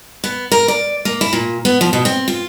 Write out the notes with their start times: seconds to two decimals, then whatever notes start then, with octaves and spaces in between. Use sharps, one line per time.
0.24 B3
0.52 A#4
0.68 D5
1.05 A#3
1.21 E4
1.33 A#2
1.65 B3
1.81 F3
1.93 B2
2.05 C4
2.28 F4